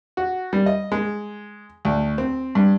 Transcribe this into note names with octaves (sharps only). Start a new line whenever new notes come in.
F#4
G3
D#5
G#3
D2
C4
G2